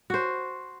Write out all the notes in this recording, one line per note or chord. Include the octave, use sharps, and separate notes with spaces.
F#4 C5